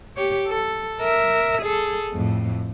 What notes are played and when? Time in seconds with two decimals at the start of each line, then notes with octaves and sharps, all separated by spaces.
0.17 G4 C#5
0.47 A4
1.01 A#4 E5
1.62 G#4 A4
2.13 F2 A2